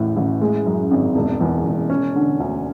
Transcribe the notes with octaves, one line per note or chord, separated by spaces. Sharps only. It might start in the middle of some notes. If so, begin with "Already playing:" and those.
Already playing: A1 E2 A2
A1
G#3
F#2
G#1
E1
E2
E1
C#4
D3
D2